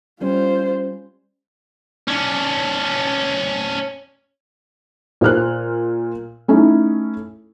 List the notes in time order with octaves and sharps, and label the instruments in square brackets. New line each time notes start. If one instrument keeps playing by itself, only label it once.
[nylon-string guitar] G3 C#4 [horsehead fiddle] F4 C5
[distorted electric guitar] C#4 D4
[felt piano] A#2 C5 F6 F#6
A3 C#4 D#4 E4